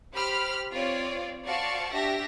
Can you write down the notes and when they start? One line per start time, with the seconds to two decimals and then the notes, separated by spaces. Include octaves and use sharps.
0.13 G4 C5 B5 F6
0.72 C4 F4 C#5 D5
1.46 F#4 C5 D5 F5 A5 C#6
1.93 D4 G4 E5 A#6